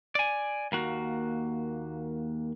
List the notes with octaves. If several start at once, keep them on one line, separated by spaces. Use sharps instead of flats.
D5 G#5
D#2 A#3 F#4